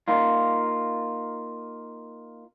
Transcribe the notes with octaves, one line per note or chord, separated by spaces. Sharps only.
A#3 D#4 F4